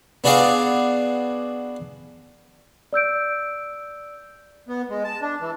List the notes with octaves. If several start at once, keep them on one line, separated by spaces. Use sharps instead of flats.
B3 D4 F#4 G#4 D5 F5
D5 E6 G6 D7
B3
G#3
A5
D4
E3